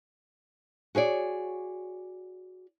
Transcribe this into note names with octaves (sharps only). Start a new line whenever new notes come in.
F#4 G#4 C#5 D5